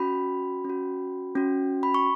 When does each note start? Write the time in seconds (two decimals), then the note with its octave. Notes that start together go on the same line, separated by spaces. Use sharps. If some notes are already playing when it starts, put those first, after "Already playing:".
Already playing: C#4 F#4 B5
0.64 C#4
0.69 F#4
1.36 C#4 F#4
1.83 B5
1.94 C#6